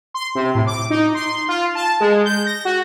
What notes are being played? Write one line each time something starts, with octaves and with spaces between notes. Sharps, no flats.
C6
C3
A2
D6
D#4
C6
F4
A5
G#3
G6
A#6
F#4